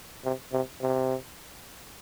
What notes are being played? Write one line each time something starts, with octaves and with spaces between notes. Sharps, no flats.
C3
C3
C3